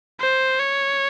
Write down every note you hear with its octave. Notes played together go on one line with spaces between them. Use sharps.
C5
C#5